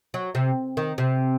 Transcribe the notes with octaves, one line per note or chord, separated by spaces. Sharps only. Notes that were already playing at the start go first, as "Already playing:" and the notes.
F#3
C3
D#3
C3